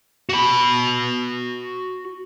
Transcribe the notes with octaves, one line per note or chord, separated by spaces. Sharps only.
F#4 B5